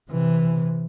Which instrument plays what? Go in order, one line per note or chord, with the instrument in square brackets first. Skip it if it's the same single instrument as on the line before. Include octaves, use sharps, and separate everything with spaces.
[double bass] C3 E3